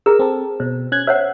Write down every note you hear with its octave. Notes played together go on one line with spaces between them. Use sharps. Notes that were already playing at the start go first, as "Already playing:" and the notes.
G#4 A#4 E6
C4 A4
B2 C5
C#4 F#6 G#6
C5 C#5 E5 F#5